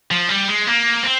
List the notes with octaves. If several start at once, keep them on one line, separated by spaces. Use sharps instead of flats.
F3
G3
G#3
A#3
C4